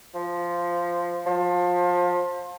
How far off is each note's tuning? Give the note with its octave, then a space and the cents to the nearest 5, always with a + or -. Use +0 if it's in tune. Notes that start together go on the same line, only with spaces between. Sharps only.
F3 -5
F3 +25